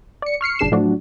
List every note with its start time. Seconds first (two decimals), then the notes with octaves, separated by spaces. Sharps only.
0.22 D5 C#7
0.41 C#6 F6 C7 C#7
0.59 G1 B2 D4 G#4 C7 E7
0.72 A2 F3 F#3 A3 D4 F#4